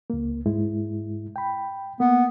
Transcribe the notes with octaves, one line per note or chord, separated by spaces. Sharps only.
C#2 A#3
G#2 G#3 E4
G5 B5
A#3 B3